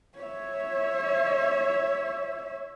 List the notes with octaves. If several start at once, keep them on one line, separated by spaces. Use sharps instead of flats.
C#5 E5